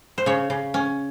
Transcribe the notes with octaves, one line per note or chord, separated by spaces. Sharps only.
C5
C#3 C#5
C#3
C#4